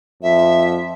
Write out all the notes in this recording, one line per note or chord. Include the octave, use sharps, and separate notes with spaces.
F2 E5